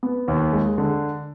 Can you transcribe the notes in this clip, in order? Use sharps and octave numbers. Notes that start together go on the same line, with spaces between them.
B3
D#2
G#3
D3